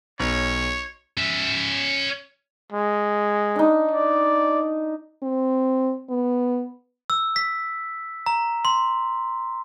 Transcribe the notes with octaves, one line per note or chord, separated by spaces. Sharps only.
B1 C#5
C#4 E5
G#3
D4 D#4
D5
C4
B3
E6
B6
A#5
C6